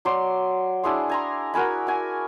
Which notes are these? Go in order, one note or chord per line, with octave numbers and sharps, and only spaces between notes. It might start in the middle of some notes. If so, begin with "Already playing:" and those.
F#3 D5 C6
D4 E4 G#4 C6
G#5 A#5 C6
F#4 A#4 G#5 B5
F#4 G#5